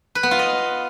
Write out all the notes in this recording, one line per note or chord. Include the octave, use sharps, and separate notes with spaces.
B4
B3
F4
D#5